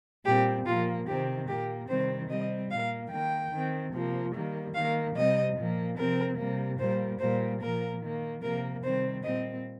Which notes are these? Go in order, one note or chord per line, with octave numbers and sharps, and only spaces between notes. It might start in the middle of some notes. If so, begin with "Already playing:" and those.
A#2 G3 C4 G4
A#2 F3 A#3 F4
C3 D#3 C4 G4
A#2 A#3 G4
C3 D#3 G3 C4 C5
C3 G3 C4 D#5
A#2 A#3 F5
D#3 A#3 G5
D#3 C4
C3 F3 A#3
D#3 G3 A#3
D#3 A#3 F5
C3 G3 C4 D#5
A#2 F3 A#3
C3 F3 C4 A#4
C3 G3 A#3
A#2 G3 A#3 C5
A#2 G3 A#3 C5
A#2 F3 A#3 A#4
D#3 A#3
C3 F3 A#3 A#4
C3 D#3 G3 C4 C5
A#2 G3 C4 D#5